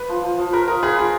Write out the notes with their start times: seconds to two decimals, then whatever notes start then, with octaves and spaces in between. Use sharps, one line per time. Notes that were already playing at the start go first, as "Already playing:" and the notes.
Already playing: B4
0.09 F3
0.23 F3
0.38 F3
0.52 A#4 B4
0.68 A#4 D#5
0.82 G#4 B4
0.98 F4 G#4